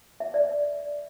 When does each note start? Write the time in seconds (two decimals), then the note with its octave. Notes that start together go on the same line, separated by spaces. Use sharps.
0.20 E5
0.34 D5